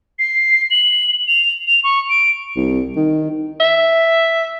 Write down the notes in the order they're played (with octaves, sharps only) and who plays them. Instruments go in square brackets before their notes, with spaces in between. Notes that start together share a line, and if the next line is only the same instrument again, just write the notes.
[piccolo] C7
F#7
F7
F7
C#6
D7
[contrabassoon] C2
D#3
[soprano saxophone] E5